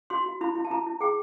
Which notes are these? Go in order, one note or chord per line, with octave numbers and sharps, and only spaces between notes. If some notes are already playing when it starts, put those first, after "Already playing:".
F#4 C6
F#4
E4 B5
E4
A5
E4 A#5
E4
G#4 G5